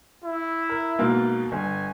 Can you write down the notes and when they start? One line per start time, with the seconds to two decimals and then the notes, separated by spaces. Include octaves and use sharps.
0.24 E4
0.69 A#4
0.99 G#2 B2 A#3
1.52 G1 G#5